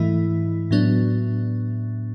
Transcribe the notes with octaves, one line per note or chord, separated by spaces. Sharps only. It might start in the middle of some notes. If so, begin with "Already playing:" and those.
Already playing: G#2 E3 A3 E4
A2 F#3 B3 D4